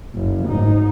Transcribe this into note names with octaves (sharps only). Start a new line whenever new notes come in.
F#1
G#2 D#4